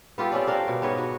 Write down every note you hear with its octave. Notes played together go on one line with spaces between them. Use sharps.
B3 F4 G4 A4
C4 C#4 D5
D4 A#4 F5 G5
B2
G#2 B3 C#5 D#5
F#4